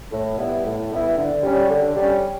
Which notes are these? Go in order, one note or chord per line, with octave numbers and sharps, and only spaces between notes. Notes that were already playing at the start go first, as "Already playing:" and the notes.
A2
G3 B3 E4
A2
G3 B3 E4
D3
G3 C#4
D3
G3 C#4